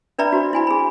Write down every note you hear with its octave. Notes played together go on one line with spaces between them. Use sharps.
D4 B4 D5 E5 A#5 B5
F#4 C5
E4 G#5 B5
G#4 B5